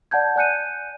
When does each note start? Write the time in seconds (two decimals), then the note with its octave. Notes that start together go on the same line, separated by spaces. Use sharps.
0.11 D5 F#5 A5 G6 G#6
0.36 D5 G#5 F#6 G6 C#7 D#7